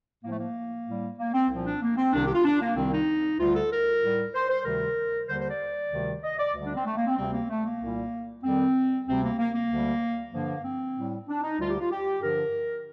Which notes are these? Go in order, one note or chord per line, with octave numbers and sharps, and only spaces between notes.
A2 F3 A#3
A3
A#3
A2 G3
A#3
C4
C2 A#2 F3
D4
A#3
C4
C2 C3 D#3 D4
G4
F4
D4
A#3
C2 C3 D#3 G3 C4
D#4
D2 D3 G3 F4
A4
A#4
A2 G3
C5
C5
D2 C3 D#3 G3 A#4
D#2 D3 G3 C5
C5
D5
D2 C3 D#3 G3
D#5
D5
D2 D3 G3
D4
C4
A3
A#3
C4
D2 C3 G3 C4
A#3
A3
A#3
C2 A#2 G3
F2 D#3 G3 C4
D2 C3 G3 C4
A#3
A#3
A#3
D2 D3 G3
G2 D3 F3 A#3
C4
A2 G3
D4
D#4
D2 D3 G3 F4
G4
F4
G4
G2 D3 F3 A#4